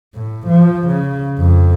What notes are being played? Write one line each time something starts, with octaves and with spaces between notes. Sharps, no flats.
A2
F3
C#3
F2